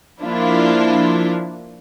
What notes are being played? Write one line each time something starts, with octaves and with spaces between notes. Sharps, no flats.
F3 A#3 D4 E4 F4